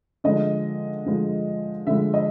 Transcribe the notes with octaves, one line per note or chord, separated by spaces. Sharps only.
D3 F3 G#3 D#5
D3 F3 G#3
D3 F3 G#3 E5
D#5